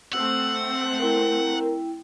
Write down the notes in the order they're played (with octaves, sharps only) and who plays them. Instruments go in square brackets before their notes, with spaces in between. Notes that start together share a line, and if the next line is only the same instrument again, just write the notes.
[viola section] A3 C4 [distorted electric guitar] F#5 [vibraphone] E6
[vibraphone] E4 G5 [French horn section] A#4